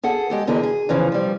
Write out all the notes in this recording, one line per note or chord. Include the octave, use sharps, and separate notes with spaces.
G#4 A4 F#5
G#3 G4 A4
E2 D3 E4 G#4 A#4 D#5
G#4
E2 C#3 E3 F3
F3 G3